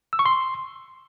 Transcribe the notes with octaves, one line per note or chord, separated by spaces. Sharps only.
E6
C#6
C6